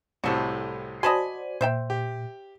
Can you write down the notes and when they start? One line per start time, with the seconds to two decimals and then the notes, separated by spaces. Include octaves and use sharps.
0.24 C2 A2 C3 F#4 A4
1.03 F#4 C5 D5 D#5 G#5 A5 B5 C6
1.61 A#2 C5 E5 G5
1.90 G4